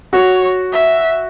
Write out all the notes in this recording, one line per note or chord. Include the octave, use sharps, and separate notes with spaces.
F#4 C#5
E5